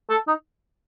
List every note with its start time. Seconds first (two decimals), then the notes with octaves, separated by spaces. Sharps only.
0.10 A4
0.28 D#4